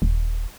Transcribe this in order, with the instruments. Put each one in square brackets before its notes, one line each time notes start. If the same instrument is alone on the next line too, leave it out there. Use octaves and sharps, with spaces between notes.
[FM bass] D#1